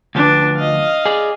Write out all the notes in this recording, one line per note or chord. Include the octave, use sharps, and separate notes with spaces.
D2 F3 D4 B4
D#5 F5
G#4 D5